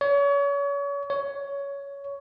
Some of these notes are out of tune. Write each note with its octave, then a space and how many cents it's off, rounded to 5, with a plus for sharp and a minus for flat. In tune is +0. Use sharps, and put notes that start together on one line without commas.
C#5 +35
C#5 +15